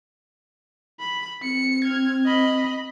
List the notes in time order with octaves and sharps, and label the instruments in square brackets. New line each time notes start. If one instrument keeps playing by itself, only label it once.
[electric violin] B5
[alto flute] C4 [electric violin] C#7
[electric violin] F6 G#6
D#5 B5